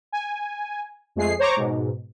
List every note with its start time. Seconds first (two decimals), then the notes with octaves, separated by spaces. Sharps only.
0.12 G#5
1.16 F2 G#3 A3 G#4 C7
1.39 C5 C#5 A#5 C#6 D6
1.56 G#2 B2